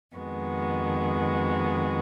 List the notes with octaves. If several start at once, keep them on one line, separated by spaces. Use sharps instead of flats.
F2 D#3 G#3 B3 F#4